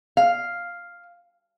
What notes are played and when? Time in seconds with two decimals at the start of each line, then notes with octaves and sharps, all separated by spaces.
0.17 F5